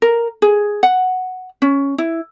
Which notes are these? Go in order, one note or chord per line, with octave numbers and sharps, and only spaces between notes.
A#4
G#4
F#5
C#4
E4